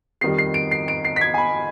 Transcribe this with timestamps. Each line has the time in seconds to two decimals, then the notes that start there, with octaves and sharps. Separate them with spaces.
0.21 F2 D#3 G3 C7
0.38 C7
0.54 D7
0.71 C7
0.88 D7
1.05 C7
1.16 B6
1.21 G#6
1.34 G#5
1.38 B5